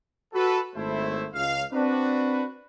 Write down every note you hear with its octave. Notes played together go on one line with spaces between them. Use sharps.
F#4 A4 B4
G#1 A3 E4 C5
C#2 F5
C4 D4 F#4 B4